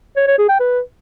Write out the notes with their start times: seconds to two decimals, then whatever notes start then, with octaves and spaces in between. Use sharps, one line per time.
0.17 C#5
0.27 C#5
0.38 G#4
0.49 G5
0.60 B4